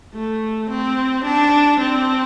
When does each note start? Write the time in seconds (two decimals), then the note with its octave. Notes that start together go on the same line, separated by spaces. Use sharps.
0.14 A3
0.71 C4
1.25 D4
1.81 C4